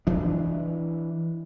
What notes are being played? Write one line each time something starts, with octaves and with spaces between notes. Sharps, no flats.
E3 D4